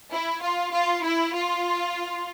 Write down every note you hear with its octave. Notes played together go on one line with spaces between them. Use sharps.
E4
F4
F4
E4
F4